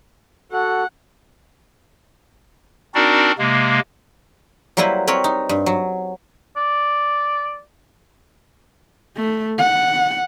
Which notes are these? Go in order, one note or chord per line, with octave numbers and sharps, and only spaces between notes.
F#4 A4 F#5
C4 D4 D#4 F#4 A#4 D5
C3 G#3 A#3
F#3 G3 A#3 E4 B4 C5
C4 A#4 B4 C#5
D#4
G2
F#3
D5
A3
F#5